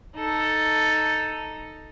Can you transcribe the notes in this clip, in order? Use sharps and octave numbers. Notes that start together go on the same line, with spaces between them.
D#4 A4